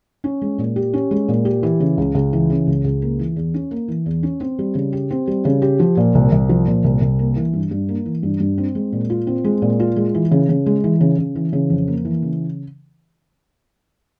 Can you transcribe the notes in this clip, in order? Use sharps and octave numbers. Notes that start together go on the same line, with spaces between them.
C#4
G#3
A#2
G4
C#4
G#3
A#2
G4
E3
C#3
C#2
C#2
E3
C#3
C#2
C#2
A#3
E3
E2
C#4
A#3
E3
E2
C#4
C4
G3
C#3
G4
C4
G3
C#3
G4
F3
A#2
C2
C2
F3
A#2
C2
C2
A#3
E3
G2
G2
A#3
E3
G2
G2
C4
G#3
A#2
F4
C4
G#3
A#2
F4
G#3
E3
C#3
C#3
G#3
E3
C#3
C#3
E3
C#3
F2
A#3
E3
C#3